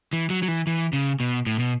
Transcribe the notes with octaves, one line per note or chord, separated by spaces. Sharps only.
E3
F#3
F#3
E3
E3
C#3
B2
A2
B2